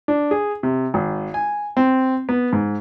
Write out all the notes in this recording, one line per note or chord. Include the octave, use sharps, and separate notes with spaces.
D4
G#4
C3
G#1
G#5
C4
B3
G#2